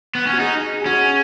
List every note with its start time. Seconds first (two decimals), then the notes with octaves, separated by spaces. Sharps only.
0.15 B3
0.27 C#4
0.33 F#4
0.40 D#4 G#4
0.81 G#4
0.86 C#4 F#4